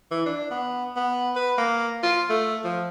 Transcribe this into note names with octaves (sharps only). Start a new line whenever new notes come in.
E3
D4
B3
B3
B4
A#3
F4
A3
F3